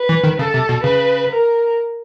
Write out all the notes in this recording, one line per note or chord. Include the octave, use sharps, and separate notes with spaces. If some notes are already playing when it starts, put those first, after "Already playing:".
Already playing: B4
E3
D#3
C#3 A4
C3
B2
C#3 B4
A#4